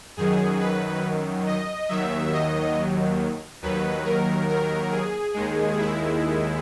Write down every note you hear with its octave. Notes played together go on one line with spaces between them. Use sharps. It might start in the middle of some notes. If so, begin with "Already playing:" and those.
F#2 D#3 F#3 G#4
B4
D#5
D#2 D#3 F#3 E5
D#5
D#2 D#3 F#3 B4
A#4
A#4
G#4
D#2 D#3 G#3
E4